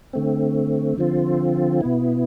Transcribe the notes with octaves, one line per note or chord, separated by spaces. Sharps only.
D3 A3 C4
D3 F3 C4 F4
B2 B3 E4